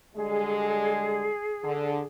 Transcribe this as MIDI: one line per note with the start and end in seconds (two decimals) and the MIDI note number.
0.15 1.30 50
0.15 1.30 55
0.15 1.30 56
0.15 2.06 68
1.64 1.99 50